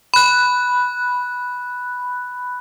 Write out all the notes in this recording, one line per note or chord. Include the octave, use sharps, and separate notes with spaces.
B5 F#6